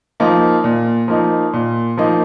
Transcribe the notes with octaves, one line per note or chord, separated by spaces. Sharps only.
F3 A#3 D#4
A#2
F3 A#3 D#4
A#2
F3 A#3 D#4